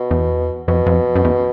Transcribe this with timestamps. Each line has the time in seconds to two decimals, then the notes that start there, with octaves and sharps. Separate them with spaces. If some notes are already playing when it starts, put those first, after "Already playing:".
Already playing: B2
0.11 E2
0.68 F2 B2
0.86 F2
1.16 F#2
1.25 E2